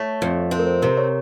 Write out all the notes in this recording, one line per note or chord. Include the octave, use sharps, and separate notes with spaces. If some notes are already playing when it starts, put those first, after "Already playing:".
Already playing: A3 C#5
F2
C4 C5
A#4
C5
C3 A#4
C#5